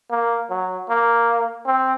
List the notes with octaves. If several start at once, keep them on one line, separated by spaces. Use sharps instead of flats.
A#3
F#3
A#3
C4